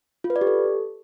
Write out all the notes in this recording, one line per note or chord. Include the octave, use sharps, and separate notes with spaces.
F4
B4
D5
G4
A4